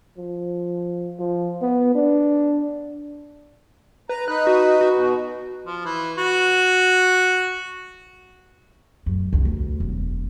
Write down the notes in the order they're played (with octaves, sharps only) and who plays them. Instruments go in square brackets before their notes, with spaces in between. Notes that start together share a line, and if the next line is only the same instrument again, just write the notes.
[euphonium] F3
F3
B3
D4
[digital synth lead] B4 [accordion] A#5
[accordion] D#4 B4 [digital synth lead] F#6
[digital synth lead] F#4
F#4
[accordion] B2
[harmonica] F3
E3
F#4
[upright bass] F#2 A2
C2 F2
D2
E1 F#3